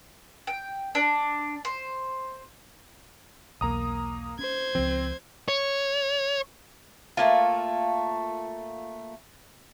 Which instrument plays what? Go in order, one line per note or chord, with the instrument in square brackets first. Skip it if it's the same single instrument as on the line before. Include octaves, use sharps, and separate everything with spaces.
[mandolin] G5
D4
C5
[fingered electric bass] B1 E2 [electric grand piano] A#3 A#5 D#6
[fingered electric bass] C#4 [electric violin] C5 G#6
[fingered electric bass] C#2 F3 [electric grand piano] C4
[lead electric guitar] C#5
[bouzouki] A3 A#3 F4